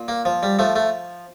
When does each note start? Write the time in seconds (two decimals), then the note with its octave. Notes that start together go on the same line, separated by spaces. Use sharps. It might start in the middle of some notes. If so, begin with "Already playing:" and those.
Already playing: A#2
0.08 A#3
0.25 F3
0.43 G3
0.59 F3 A3
0.76 A3